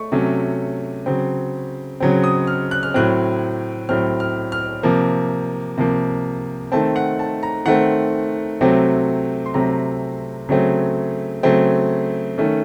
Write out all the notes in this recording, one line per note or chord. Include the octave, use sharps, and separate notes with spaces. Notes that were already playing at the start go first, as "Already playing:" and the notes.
Already playing: A3 C#6
C3 F#3 A3 C#4
C#3 F#3 C4
C#3 F#3 C4
D#6
F6
F#6
F6
A2 F#3 C4 F#6
A2 F#3 C4 F6
F6
F6
C3 F3 A#3
C3 F3 A#3
D#3 A3 C4 A5
F#5
A5
A#5
D#3 A3 C4 F#5
C3 F#3 A3 C4
C6
C3 F#3 A3 C4 A#5
C#3 F#3 A3 C4
C#3 F#3 A3 C4
D#3 A3 C#4